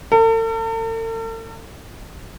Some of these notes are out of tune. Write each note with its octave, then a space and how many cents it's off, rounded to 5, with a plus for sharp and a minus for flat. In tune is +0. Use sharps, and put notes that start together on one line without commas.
A4 +45